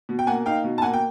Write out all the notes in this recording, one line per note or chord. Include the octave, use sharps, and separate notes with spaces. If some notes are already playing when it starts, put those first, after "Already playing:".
B2
G5
A#3 F#5 G#5
D#4 F5 G5
B2
A5
A#3 F#5 G#5
G5